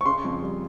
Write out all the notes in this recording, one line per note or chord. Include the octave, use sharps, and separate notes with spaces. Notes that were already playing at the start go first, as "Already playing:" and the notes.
C#6
C#3 C6
F2
G3